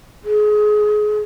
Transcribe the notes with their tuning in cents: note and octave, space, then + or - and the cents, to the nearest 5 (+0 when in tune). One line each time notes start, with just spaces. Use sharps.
G#4 +25